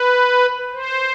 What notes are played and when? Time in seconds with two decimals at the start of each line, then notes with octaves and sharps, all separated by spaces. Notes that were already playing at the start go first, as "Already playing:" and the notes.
Already playing: B4
0.73 C5